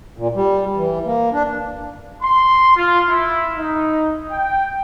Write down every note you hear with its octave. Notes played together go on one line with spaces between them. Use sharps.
A#2
G3
E3
A#3
D4
C6
F4
E4
D#4
G5